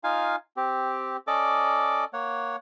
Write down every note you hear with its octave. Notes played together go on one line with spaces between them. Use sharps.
D#4 F4 F5 G#5
C4 G4
C#4 A4 D5 D#5 D6
A#3 C#5 F#5